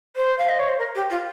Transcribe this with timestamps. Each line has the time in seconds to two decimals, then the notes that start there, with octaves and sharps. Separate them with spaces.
0.16 C5
0.38 F5
0.49 D#5
0.59 C#5
0.69 C5
0.79 A#4
0.95 G4
1.10 F4